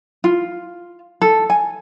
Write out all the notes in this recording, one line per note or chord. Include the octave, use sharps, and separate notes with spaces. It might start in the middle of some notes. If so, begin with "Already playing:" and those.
F4
A4
G#5